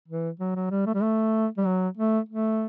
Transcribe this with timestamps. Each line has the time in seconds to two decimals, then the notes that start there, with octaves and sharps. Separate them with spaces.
0.08 E3
0.40 F#3
0.55 F#3
0.71 G3
0.86 A3
0.94 G3
1.02 A3
1.57 G3
1.66 F#3
1.97 A3
2.29 A3